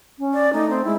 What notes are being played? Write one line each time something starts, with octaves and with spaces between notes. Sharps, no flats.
C#4
D5
A3 D#4
C4
G#3 E4